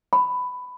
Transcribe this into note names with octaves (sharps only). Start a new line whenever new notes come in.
B5